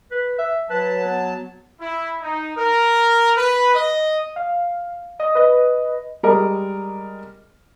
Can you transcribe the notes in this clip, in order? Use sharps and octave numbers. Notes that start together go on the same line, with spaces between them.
B4
E5
F#3 B4 A5
B3
E4
D#4
A#4
B4
D#5
F5
D#5
B4 D#5
G3 G#3 A#4 D#5